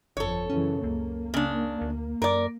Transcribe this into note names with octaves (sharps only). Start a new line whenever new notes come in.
G1 F2 A4 C#5
F#2 C#3 E3 C#4
C#2 A#3
C#3 D4
D2
F#2 A#4 D5